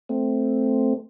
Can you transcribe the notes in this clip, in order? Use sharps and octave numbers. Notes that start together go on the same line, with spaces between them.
A3 C4